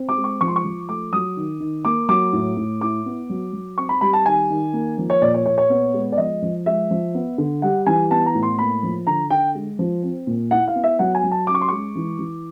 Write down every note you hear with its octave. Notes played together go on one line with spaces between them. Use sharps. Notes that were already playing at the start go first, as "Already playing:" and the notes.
Already playing: C4
D6
G#3
C#6
F3 C#6
C6
C#6
F3
A3 D6
F#3 D#6
D#3
D#3
A#3 D6
F#3 D6
A2
A2
E4 D6
B3
F#3
F#3
C4 C#6
B5
G3 B5
A5
D#3 G#5
D#3
A#3
F3
C#5
A#2 D5
C#5
A#2 C#5
C#5
B3
G#3
D5
F3 D#5
F3
G#3 E5
F3
B3
D3
G3 F#5
E3 G#5
B3 A5
A#5
A2
C6
A#3 B5
F3
D3 A#5
D3 G5
G#3
F3
C4
A#2
E4 F#5
F5
B3
E5
F#3 F#5
G#5
F#3
A5
C#4 D6
C#6
C6
G#3 C#6
E3
E3